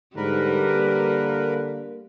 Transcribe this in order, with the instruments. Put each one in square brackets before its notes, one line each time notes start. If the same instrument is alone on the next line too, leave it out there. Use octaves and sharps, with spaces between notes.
[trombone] G#2 [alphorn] D3 [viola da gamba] G3 [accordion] A#4 B4
[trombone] A#3